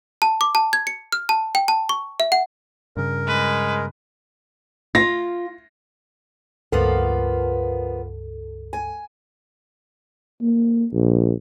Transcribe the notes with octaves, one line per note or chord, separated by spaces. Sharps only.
A5
D6
A5
G#6
C#7
F6
A5
G5
A5
C#6
E5
F#5
G2 C#3 A#4
G#3 B4
F4 A#6
C#2 G2 F3 A#3 B3 A4
G#5
A#3
A#1